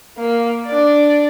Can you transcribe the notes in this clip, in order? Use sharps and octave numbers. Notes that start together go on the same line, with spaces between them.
A#3
D4 D5